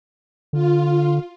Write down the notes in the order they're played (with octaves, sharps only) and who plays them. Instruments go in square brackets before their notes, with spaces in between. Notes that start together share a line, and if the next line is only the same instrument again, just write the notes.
[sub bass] D3 [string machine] F4